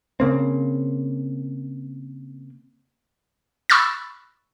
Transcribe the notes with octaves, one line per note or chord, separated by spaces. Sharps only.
C#3 A#3 C4
B5 C#6 E6 F#6 A6